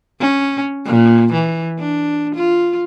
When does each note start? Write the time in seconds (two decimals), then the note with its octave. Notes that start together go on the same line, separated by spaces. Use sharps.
0.20 C#4
0.85 A#2
1.33 E3
1.79 D4
2.34 F4